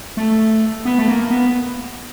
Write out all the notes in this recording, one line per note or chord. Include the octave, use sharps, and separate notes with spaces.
A3
B3
A3
A#3
B3